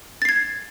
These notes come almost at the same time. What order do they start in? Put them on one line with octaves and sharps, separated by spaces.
A6 C7 G#6